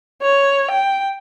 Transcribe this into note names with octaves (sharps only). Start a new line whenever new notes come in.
C#5
G5